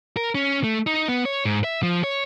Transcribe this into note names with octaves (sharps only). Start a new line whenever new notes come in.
A#4
C#4
A3
D#4
B3
C#5
G#2
E5
F3
C#5